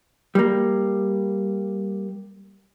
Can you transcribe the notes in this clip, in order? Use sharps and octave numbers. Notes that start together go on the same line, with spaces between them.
G3 A#3